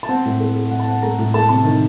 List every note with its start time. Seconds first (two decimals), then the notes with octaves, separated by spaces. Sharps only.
0.03 A5
0.09 C4 F#5
0.25 A2
0.40 A3
0.55 A3
0.71 A2 F#5
0.80 A5
0.87 C4 F#5
1.03 A3 A#5
1.19 A2
1.34 A3 A5
1.49 C3 A5
1.65 D#3